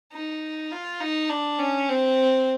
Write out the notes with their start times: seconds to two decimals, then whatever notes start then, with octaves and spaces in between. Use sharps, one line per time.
0.12 D#4
0.71 F4
1.00 D#4
1.29 D4
1.59 C#4
1.88 C4